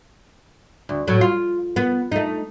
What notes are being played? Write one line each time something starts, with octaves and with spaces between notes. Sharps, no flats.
D2
A2 F#3 F#4
F4
B3
A3 D#4